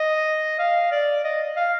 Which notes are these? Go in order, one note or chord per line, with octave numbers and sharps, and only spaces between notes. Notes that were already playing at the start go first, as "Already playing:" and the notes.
Already playing: D#5
F5
D5
D#5
F5